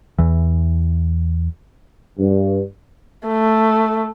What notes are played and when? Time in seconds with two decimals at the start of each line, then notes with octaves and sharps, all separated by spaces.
0.19 E2 E3
2.19 G2
3.28 A3